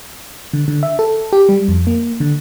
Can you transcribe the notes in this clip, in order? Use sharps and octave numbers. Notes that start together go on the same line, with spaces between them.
D3
D3
E5
A4
G4
G3
F2
A#3
D3